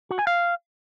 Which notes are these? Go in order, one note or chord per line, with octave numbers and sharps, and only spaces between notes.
F#4
G#5
F5